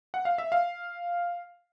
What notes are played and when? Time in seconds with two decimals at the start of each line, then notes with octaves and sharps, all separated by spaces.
0.14 F#5
0.25 F5
0.38 E5
0.52 F5